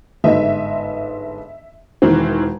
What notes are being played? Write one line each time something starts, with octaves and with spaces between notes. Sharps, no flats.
G1 G#2 D#5 E5
E1 D#3 E3 C4